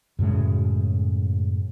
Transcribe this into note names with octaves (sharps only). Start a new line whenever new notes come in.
F#2 A2 C#3 G#3